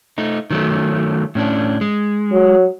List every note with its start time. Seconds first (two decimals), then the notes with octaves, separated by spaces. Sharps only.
0.18 A3 D#4
0.51 D#3 F#3 A3
1.35 A2 C#4 D4
1.81 G#3
2.32 F#3